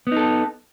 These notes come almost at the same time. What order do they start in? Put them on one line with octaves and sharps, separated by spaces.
B3 D#4 A4